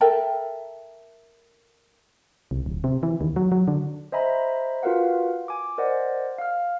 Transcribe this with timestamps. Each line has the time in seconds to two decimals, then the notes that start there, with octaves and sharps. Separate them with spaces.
0.01 A4 A#4 E5 G5
2.51 C2
2.66 D1
2.84 C3
3.03 E3
3.21 D#2
3.36 F#3
3.52 F#3
3.68 D3
4.12 C5 D#5 E5 G#5 A#5 B5
4.83 F4 F#4 A#4 B4 F5 F#5
5.48 G#5 D6
5.78 A#4 C5 D5 D#5 F#5
6.38 F5 F6